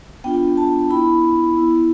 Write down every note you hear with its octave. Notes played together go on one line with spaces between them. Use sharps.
B3 D4 F4 G5
A5
B3 E4 B5
B3 E4